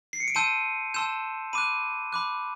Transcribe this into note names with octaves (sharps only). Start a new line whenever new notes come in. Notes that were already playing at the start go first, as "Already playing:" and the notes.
C7
C#7
D7
A5 C6 E6 G6 D#7
A5 C6 E6 G6 E7
B5 D6 F#6 D#7
B5 D6 F#6